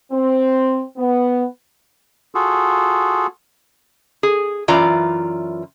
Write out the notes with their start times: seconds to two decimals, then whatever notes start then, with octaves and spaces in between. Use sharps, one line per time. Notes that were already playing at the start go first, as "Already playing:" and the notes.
0.11 C4
0.97 B3
2.35 F4 F#4 G#4 A4
4.23 G#4
4.68 F#2 E3 F4 D5 A#5